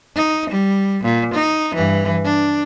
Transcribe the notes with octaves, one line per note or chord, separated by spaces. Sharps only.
D#4
G3
A#2
D#4
G2 E3
D4